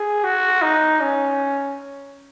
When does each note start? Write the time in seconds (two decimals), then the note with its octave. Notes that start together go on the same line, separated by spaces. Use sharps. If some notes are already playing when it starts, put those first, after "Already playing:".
Already playing: G#4
0.24 F#4
0.62 D#4
1.00 C#4